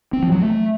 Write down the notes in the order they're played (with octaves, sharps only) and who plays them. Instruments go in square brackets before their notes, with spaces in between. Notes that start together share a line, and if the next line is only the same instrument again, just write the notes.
[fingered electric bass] C4
F3
F#3
A3